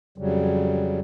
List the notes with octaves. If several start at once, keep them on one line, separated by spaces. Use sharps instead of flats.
F2 C#3 F#3 G3